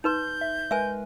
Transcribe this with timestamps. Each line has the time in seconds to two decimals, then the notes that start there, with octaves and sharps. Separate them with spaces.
0.04 D#4 B4 C6 G6
0.41 E5
0.71 G#3 A#4 B4 E5 G#5